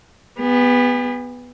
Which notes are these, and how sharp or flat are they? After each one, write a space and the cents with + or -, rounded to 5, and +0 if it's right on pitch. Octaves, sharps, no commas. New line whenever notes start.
B3 +0 G#4 -45